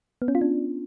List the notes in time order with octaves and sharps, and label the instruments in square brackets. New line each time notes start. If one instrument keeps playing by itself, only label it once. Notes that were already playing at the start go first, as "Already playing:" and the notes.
[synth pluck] B3
C#4
F4
D4